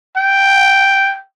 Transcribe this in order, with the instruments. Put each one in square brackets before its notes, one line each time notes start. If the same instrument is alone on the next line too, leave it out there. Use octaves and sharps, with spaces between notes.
[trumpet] G5